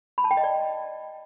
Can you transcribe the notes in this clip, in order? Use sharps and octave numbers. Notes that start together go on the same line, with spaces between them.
B5
A5
G5
D#5
D5